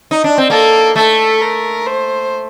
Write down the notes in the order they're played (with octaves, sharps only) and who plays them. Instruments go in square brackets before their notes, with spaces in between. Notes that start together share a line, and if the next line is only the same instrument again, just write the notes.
[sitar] D#4
D4
C4
[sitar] A#3 [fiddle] A4
[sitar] A3 [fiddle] A4
[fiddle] A#4
C5